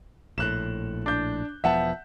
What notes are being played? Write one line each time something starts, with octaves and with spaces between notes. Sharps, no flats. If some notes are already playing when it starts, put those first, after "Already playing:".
A#1 A2 F#6 E7
D4 G6
E1 F3 B3 E5 F#5 A5